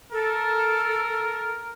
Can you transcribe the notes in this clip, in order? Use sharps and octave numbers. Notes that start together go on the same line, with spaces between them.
A4 A#4